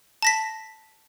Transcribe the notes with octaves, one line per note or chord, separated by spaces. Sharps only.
A5 A#6 B6